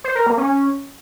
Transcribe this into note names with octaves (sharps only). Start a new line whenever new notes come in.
C5
A#4
A#3
C#4